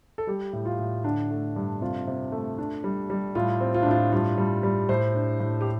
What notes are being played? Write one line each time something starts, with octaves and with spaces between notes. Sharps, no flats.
A4
G3 G4
A2
F4
A2
D3 D4
A3
G2
C3 F4
C3
A3
D4
G3
G3
A2 F4
C4
F4
D4
A2 F4
G2 F4
G3
G3
A2 C5
D4
A2
G4